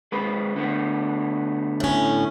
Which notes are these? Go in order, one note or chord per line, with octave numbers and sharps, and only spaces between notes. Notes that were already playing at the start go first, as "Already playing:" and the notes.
G#3 C4 B4
D3 A3 B3
A2 C#4